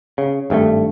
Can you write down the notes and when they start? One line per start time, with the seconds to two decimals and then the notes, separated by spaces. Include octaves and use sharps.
0.18 C#3
0.50 G#1 G2 D#3 A3